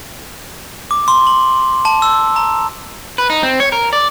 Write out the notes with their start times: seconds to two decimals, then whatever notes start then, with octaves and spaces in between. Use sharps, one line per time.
0.91 D6
1.08 C6
1.27 F#7
1.85 A5
2.02 E6
2.36 A#5
3.18 B4
3.30 D#4
3.43 C4
3.60 C#5
3.72 A#4
3.93 D5